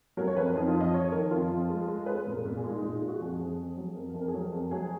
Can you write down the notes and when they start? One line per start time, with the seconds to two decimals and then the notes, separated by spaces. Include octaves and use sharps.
0.17 F#3 A#4
0.27 C#5
0.36 F2 B4
0.46 A#4
0.55 F2 D#4
0.68 F4
0.74 F2
0.81 D#5
0.93 F2 C#5
1.12 D#3 A#4
1.31 F2 F4
1.51 F2
1.70 G#3
1.88 G#3
2.06 G#3 B4
2.26 A#2
2.32 A#4
2.45 A#2 A#4
2.57 G#4
2.64 G#3
2.70 D#4
2.82 A#2 D#4
2.95 F4
3.02 G#3
3.08 F#4
3.20 F2 G#4
3.39 F2
3.58 F2
3.77 F#3
3.95 F2 A#4
4.09 A#4
4.14 F2
4.21 A#4
4.28 G#4
4.34 F#3 A#4
4.53 F2
4.71 F#3 G#4